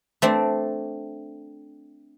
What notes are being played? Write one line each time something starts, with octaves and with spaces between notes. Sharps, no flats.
A3 C4 D4